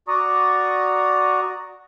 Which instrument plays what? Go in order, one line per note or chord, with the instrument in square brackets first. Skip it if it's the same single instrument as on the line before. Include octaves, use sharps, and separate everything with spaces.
[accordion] F#4 D5 A#5 C#6 D#6